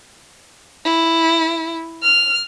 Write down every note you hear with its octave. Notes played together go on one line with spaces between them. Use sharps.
E4
F6